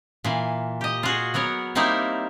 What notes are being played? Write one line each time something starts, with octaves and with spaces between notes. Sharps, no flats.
A#2 E3 F5
G4 D#5
F4 F#4 G#4
F#3 B3 A#4 C#5
G3 A#3 C4 D#4 E4 A#4